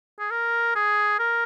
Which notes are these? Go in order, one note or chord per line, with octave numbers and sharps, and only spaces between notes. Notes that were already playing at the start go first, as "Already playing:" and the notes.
G#4
A#4
G#4
A#4